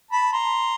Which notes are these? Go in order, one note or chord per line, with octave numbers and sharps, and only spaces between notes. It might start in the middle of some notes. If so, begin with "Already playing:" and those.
A5 B5
A#5 C6